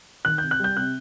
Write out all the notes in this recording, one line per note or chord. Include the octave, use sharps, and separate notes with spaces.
D#3 F#6
C3 G6
F#6
G3 G6
C3 F#6